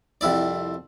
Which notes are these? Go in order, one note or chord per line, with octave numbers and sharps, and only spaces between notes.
C2 F2 E4 D5